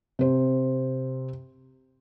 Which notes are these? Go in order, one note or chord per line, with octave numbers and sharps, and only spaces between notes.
C3 C5